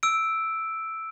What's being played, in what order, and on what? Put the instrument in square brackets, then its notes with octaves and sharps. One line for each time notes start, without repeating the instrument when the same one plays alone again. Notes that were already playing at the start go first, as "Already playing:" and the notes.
[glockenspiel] E6 D7